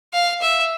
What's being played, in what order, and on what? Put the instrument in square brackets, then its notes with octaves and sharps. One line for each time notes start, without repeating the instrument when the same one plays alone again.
[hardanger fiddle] F5
E5